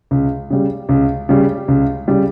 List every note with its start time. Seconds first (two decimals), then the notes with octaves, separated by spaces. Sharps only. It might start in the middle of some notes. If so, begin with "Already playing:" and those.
0.11 C#2
0.50 C#3 G3
0.89 C#2
1.29 C#3 G3
1.68 C#2
2.08 C#3 G3